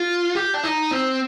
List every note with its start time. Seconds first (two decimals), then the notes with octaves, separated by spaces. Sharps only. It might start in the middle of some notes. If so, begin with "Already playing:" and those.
Already playing: F4
0.35 G4
0.54 D4
0.64 D#4
0.91 C4